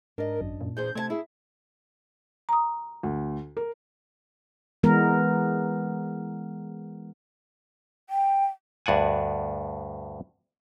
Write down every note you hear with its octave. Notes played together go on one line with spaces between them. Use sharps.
G#2 D4 A#4 D#5
G#1 F#2
A#2
E2 G#4 C5 G6
C3 A3 C#5 A5 G#6
E4 G#4 E5
A#5 D#6
D2
A#4
E3 G#3 B3 A#4
G5
D2 G2 D5 F#5 G#5